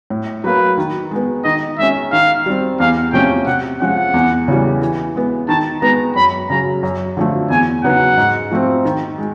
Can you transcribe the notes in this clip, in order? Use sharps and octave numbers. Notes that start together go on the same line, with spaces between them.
A2
F#3 A#3 B4
D#3
G#3 B3
D#3 D#5
G#3 C#4 E5
D#3 F5
G3 C4
E2 F5
C3 F3 A3 C#4 G5
C3 F#5
F3 G#3 C#4 F#5
E2
C#3 E3 G3
E3
G#3 B3
D#3 A5
G#3 B3 A#5
F#2 B5
C#3 F#3 A#5
F#2
D3 F3 A3
E2 G#5
C#3 F#3 B3 D#4 F#5
G#2
F3 A3 C4
D#3
G#3